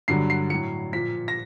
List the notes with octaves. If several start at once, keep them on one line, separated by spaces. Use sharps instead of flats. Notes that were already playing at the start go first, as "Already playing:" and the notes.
G2 D3 F#3 C7
C7
A2 F#3 C#7
A#2 F3 B6
A#6